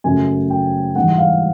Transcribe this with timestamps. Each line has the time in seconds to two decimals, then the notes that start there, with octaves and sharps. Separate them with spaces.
0.04 F#2 C#3 F#3 A3 G#5
0.50 G5
0.95 G#2 E3 G3 F#5
1.18 F5